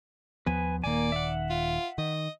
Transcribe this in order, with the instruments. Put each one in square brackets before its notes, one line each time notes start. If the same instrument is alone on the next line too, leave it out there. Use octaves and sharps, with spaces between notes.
[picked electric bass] D#2 F3 B3 [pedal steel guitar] B4 G#5
[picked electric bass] D#1 D#3 [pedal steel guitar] A#3 G#5 [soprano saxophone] D5
[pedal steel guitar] E5 F#5
[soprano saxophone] F4
[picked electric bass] D#3 [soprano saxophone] D#5